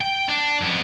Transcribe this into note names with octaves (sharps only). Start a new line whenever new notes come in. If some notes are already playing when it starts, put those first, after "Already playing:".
G5
D4
F2 B3